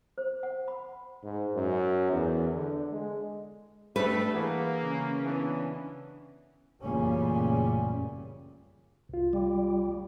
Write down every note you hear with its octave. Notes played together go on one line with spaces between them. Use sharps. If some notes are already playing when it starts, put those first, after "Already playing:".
C5
F#5
B5
G#2
F#2
E2
D3
G#3
G3 A3 D4 B4
E3 A#3 G#4 F#5
C#3 C#4
E3 B3 D4
A1 F#2 A#2 C#3 G3 C#4
C2 F4
G3